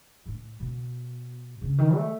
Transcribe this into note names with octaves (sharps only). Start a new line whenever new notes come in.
A2
B2
C#3
D#3
A3